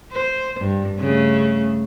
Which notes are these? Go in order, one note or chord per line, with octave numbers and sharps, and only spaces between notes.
C5
G2
C#3 A3